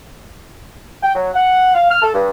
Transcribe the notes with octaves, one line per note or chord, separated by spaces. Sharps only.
G5
F#3
F#5
F5
F6
A4
G2